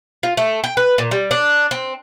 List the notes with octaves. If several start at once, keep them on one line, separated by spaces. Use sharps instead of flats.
F4
A3
G5
B4
A#2
G3
D4
C4